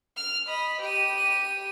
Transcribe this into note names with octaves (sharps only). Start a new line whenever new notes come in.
F6
D#5 B5
G4 D#7